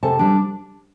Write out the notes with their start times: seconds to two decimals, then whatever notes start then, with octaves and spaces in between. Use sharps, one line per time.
0.03 C3 A4 A5
0.19 G3 D4